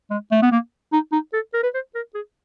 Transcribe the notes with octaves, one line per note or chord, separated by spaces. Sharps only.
G#3
A3
B3
A#3
D#4
D#4
A4
A#4
B4
C5
A#4
G#4